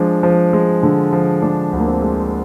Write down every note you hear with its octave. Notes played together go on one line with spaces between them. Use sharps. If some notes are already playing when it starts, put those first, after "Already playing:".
Already playing: F3 G#3 D4
F3
G#3
D3
F3
G#3 D4
D2
A#3
C4
G#3